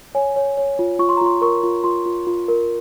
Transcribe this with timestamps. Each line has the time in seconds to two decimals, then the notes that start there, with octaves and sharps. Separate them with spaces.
0.15 C#5 G#5
0.36 C#5
0.57 C#5
0.79 F4
0.99 F4 C#6
1.09 C6
1.17 A#5
1.21 F4 C6
1.42 A#4 C#6
1.63 F4
1.84 F4 C6
2.06 F4
2.27 F4
2.48 A#4